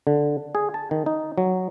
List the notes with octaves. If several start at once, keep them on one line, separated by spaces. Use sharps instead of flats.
D3
G#4
A5
D#3
D#4
F#3